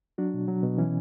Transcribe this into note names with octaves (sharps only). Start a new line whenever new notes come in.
F#3 D4 F#4
B2
F#3
B2
E3 C#4